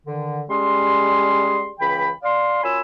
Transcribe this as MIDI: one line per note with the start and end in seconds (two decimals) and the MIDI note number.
0.06 0.40 50
0.06 0.40 51
0.48 1.69 55
0.48 1.69 56
0.48 1.69 61
0.48 1.69 68
0.48 1.69 84
1.79 2.09 37
1.79 2.09 52
1.79 2.09 79
1.79 2.09 83
2.23 2.60 74
2.23 2.60 77
2.23 2.60 84
2.62 2.80 42
2.62 2.80 65
2.62 2.80 73
2.62 2.80 80
2.62 2.80 83
2.62 2.80 88